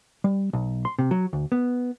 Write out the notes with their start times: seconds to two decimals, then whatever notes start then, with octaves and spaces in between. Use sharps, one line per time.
0.24 G3
0.53 B1
0.85 C6
0.99 C3
1.11 F#3
1.33 D2
1.52 B3